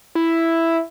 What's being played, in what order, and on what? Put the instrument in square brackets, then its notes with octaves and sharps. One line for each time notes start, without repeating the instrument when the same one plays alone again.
[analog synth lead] E4